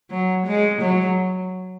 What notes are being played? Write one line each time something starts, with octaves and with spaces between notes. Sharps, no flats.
F#3
G#3
F#3